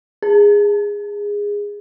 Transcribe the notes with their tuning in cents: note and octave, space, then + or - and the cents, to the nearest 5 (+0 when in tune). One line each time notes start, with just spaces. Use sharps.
G#4 -15